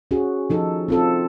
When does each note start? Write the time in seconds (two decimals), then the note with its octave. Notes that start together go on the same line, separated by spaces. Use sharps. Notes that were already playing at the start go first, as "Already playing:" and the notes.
0.11 C#4 F#4 G#4
0.50 F3 D#4 A4
0.88 C4 F4 A4